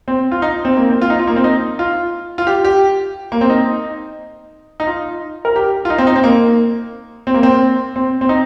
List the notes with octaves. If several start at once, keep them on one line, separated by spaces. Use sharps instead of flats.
C4
F4
D#4
C4
A#3
C4
F4
D#4
F4
A#3
C4
D#4
F4
F4
G4
G4
A#3
C4
D#4
D#4
F4
A#4
G4
F4
D#4
C4
D#4
C4
A#3
C4
A#3
C4
C4
C4
D#4